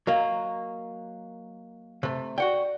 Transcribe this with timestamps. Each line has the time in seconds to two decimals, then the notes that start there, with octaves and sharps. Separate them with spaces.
0.07 F#3 A#3 D#5 F5
2.03 C3 A3
2.38 F#4 D5 F#5 G5